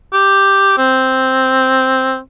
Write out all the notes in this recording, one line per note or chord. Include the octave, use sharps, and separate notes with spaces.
G4
C4